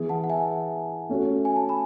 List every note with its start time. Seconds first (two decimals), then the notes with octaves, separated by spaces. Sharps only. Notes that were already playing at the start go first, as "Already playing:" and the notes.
Already playing: E3 B3 E4 G#4
0.09 F#5 A5
0.24 F#5
0.29 E5 G#5
1.09 A3 C#4 F#4
1.45 G#5
1.56 A5
1.69 G#5 B5